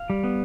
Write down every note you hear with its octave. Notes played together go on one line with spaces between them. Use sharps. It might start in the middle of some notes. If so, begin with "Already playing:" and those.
Already playing: F5
G3
B3